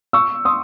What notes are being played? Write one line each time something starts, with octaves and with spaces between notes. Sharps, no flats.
C#6 E6
C6 D#6